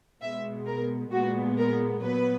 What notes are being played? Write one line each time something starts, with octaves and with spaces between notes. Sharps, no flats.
B2 G#3 B3 E5
A#4
A#2 G#3 B3 F#4
A#4
A#2 F#3 B3 B4